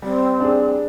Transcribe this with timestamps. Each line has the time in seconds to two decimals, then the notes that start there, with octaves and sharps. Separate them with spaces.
0.02 G3 C4
0.40 D4 G#4